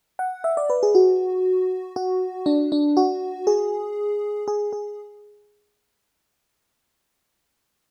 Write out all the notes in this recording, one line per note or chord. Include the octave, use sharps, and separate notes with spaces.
F#5
E5
D5
B4
G#4
F#4
F#4
D4
D4
F#4
G#4
G#4
G#4